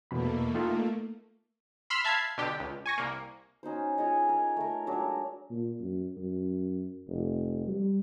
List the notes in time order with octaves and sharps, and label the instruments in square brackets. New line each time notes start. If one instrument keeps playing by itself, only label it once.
[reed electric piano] E2 B2 B5 [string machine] A3 A#3
[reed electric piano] D#4 F4 A4
[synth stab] B5 C6 E6 F6 B6
E5 F5 A5 B5 G#6 C7
B1 D3 G4
C#2
G#5 C#6 A#6
C2 A#3
[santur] C#4 D#4 F#4 C5
F4 G#4 C#5 D#5
A#4
A3 A#4
F#3 G#3 D4 A#4
[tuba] A#2
F#2
F#2
F1
G3